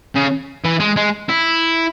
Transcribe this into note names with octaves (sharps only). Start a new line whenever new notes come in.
C#3
E3
G#3
G#3
E4